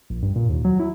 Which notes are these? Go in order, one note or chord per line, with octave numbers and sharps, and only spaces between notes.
A#1
G2
A#2
D#2
F#3
E4